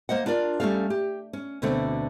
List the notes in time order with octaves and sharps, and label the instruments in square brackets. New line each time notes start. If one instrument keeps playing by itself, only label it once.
[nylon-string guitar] A#3 C5 D#5 F#5
D4 F4 A#4 D5
G3 A3 C#4 G4 A4 F5
G4
C#4
D2 B2 D3 A3 C4